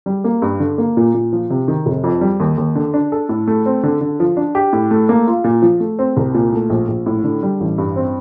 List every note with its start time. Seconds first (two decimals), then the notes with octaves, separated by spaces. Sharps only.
0.06 G3
0.24 A#3
0.42 G2
0.60 D3
0.78 A#3
0.97 A#2
1.14 A#2
1.33 F3
1.50 C3
1.68 D#3
1.86 F1
2.04 F2
2.21 G3
2.40 D#2
2.57 D#2
2.75 D3
2.94 D4
3.12 A4
3.29 A2
3.47 A3
3.66 C4
3.83 D3
4.01 D3
4.20 F3
4.37 D4
4.55 G4
4.73 A2
4.91 A3
5.09 A#3
5.27 F4
5.44 A#2
5.62 F3
5.80 A3
5.99 C4
6.17 C2
6.34 A#2
6.53 A3
6.70 A#1
6.88 A#1
7.06 A2
7.24 D3
7.43 G3
7.60 A1
7.78 G2
7.96 C4